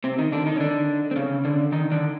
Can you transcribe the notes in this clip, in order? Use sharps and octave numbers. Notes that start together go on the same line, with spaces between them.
C3 C4
D#3 D#4
D3 D4
D#3 D#4
C#4
D3 D4
C4
C#3 C#4
D3 D4
D#3 D#4
D3 D4